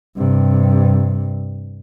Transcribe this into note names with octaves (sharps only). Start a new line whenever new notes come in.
G2 C3